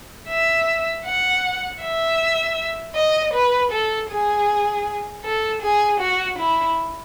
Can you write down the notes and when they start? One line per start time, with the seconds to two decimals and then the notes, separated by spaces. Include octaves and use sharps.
0.29 E5
1.05 F#5
1.81 E5
2.95 D#5
3.33 B4
3.71 A4
4.10 G#4
5.24 A4
5.62 G#4
6.00 F#4
6.38 E4